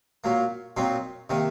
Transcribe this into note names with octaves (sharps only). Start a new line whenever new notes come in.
A#2 F#3 A#3
A#2 F#3 C4 D#4
C3 D#3 A#3